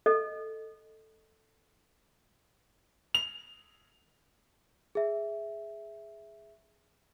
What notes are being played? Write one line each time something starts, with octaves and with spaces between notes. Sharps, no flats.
A4 D#5
F7
G#4 E5